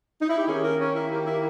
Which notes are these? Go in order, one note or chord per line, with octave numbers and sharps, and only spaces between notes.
D#4
E4
G4
D#3 A#3 C#4 G#4
A#4
C#4
E4
G4
E4